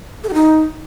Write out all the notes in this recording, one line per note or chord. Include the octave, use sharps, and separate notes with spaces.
A4
G4
D#4